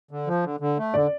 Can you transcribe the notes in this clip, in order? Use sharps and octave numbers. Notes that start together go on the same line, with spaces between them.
D3
F3
D3
D3
A3
D3 D5